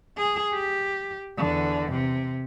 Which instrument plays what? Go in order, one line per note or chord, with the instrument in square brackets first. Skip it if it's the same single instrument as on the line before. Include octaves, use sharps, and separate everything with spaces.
[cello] G#4
G4
E2 D3
C3